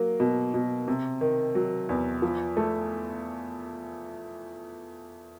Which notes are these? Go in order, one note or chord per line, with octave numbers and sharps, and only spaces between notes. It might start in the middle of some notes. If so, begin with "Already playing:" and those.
Already playing: F#3 A#3
B2
B2
C3
D#3
F#3
E2
F3
A3